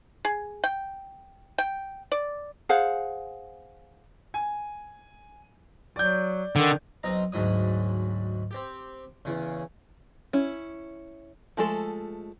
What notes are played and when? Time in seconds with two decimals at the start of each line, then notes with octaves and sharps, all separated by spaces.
0.25 G#4
0.64 G5
1.58 G5
2.12 D5
2.69 G#4 C5 F5 F#5
4.34 G#5
5.96 F#3 D5 G6
6.56 D3 D#3
7.03 B1 C4 D#5 A#5
7.32 D2 G#2 F#3 D#6
8.51 C4 G4
9.25 E2 C#3
10.33 C#4 E4
11.57 F3 G#3 A3 A4